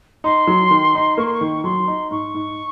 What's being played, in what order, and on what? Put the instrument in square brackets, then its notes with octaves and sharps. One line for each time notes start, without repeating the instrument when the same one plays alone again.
[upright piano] D#4 [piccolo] C6
[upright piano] F#3
D#3
D#4
[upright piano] A#3 [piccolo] C#6
[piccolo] C6
C#6
[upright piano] D#3
[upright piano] F#3 [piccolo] C6
[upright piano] D#4
[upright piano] G#2 [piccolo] C#6
[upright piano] G#2